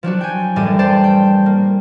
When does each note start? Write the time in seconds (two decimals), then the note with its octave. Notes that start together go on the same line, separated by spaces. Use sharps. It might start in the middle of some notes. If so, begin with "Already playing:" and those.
0.03 F3 F#3 D4 F#4
0.21 G5 G#5
0.56 A1 F#2 A2 G3 D4 D#7
0.79 C5 D5 G5 A5
1.04 G5
1.46 A#3